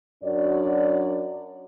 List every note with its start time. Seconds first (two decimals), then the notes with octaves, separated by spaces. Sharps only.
0.23 F#2 D4 F#4 C#5 D5